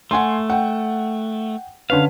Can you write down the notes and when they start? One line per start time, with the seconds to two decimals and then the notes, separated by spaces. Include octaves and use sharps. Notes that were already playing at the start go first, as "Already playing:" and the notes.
0.11 A3 F#5 G#5 C6
0.50 F#5 G5
1.90 D3 C#4 B4 F5